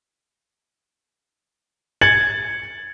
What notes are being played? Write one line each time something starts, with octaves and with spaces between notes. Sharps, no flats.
G#6 A6 C#7 F#7